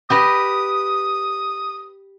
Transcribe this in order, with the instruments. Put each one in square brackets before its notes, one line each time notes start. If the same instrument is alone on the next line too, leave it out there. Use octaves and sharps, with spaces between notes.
[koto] G4 B4 D#5 [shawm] D#6